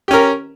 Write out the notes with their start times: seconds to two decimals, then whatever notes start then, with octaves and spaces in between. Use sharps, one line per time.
0.08 G4
0.11 C#4
0.13 A#4